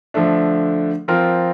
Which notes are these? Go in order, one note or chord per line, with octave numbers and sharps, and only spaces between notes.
D3 F3 A3 D4
F3 C4 F4 A#4